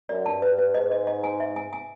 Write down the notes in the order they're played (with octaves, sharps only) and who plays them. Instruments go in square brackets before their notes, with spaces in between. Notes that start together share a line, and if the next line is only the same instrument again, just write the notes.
[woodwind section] F#2 [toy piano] D5
[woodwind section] G2 [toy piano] A5
[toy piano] B4
B4
[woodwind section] G#2 [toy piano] D#5
[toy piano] D#5
D#5
G#5
E5
G#5
G#5